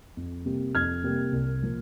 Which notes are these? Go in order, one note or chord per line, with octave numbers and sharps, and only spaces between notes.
F2
C3 G3 A#3
F2 F6 G#6
C3 G3 A#3
C2
A#2 F3 A#3